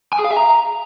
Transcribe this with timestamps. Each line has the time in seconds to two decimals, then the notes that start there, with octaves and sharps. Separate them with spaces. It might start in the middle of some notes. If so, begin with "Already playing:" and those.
0.13 G#5
0.19 G#4
0.25 F5
0.31 E5
0.37 A#5